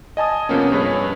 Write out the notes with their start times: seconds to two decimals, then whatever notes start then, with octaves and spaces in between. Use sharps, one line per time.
0.17 D#5 G#5 A5 D#6
0.49 C3 F3 A#3 B3 C#4
0.72 G2 G#4 B4 C#5